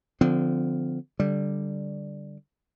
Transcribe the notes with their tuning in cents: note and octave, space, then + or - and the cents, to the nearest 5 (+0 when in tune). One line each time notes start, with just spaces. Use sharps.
D3 +0 F3 +0 C4 -40
D3 +0 G3 +0